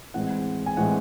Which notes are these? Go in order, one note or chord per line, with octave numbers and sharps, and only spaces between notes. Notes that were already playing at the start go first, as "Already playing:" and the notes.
A2 E3 G#3 C4 F#5
G#5
A2 E3 G#3 C4 F#5